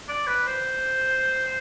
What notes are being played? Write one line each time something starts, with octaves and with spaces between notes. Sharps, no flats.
D5
B4
C5